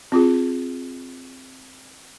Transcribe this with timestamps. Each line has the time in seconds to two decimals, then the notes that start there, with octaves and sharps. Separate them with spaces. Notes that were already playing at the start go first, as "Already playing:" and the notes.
0.12 C4 F4 G#4